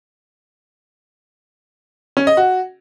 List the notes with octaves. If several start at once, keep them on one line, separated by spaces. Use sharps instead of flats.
C#4
D#5
F#4